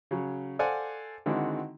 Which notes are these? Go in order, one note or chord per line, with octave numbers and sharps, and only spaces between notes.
C#3 F#3
A4 C5 D5 F5 F#5 G#5
D3 D#3 G#3 C4 E4 F#4